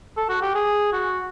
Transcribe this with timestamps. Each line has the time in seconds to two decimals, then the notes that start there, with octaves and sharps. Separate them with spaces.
0.17 A4
0.29 F#4
0.42 G4
0.55 G#4
0.93 F#4